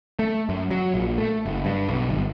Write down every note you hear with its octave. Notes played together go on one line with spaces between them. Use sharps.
A3
F#2
F#3
A#1
A3
F#1
G2
B1
G1